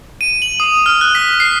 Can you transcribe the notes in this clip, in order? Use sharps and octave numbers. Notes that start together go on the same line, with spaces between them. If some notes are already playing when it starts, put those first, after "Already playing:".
D#7
F#7
D#6
F6
F#6
B6
C7